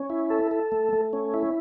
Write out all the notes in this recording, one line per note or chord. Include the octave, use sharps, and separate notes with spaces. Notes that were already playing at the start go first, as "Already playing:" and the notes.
Already playing: C#4
E4
A4
A4
A3
A3
C#4
E4